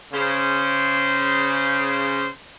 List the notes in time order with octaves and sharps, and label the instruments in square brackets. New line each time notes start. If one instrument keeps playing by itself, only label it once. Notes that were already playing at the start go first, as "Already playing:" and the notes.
[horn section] C#3 C5